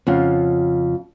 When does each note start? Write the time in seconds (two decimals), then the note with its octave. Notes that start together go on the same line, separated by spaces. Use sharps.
0.07 F2 C#3 F4 F#5